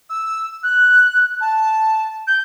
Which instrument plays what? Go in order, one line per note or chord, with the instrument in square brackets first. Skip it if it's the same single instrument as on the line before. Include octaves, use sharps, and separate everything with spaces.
[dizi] E6
F#6
A5
G6